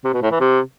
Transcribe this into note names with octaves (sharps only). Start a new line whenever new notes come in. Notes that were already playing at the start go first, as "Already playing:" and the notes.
C3
B2
A2
E3
C3